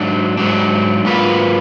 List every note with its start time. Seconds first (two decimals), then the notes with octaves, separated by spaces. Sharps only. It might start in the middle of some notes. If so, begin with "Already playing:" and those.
Already playing: G#2 F#3 D4
0.37 G#2 F#3 D4
1.05 G#2 F#3 A#3 F4 B4